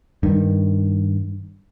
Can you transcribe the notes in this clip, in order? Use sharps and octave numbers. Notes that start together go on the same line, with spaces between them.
G2 D#3